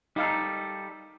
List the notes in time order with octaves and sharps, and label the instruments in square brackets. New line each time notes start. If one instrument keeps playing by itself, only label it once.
[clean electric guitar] G3 A4 [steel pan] D#4 F5 A5